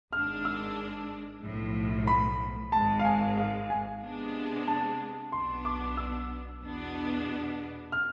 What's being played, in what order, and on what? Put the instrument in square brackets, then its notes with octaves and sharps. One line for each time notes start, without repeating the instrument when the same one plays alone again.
[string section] G#1 G#2 G#3 D4 [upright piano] F6
[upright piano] E6
[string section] B1 A2 F3
[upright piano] B5
[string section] G#1 G#2 G#3 [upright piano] A5
[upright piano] F5
G#5
F5
G#5
[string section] C3 G#3 B3 D4
[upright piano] A5
[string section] B1 B2 B3 D4 [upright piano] C6
[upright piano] D6
E6
[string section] E2 B2 B3 D4
[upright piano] F6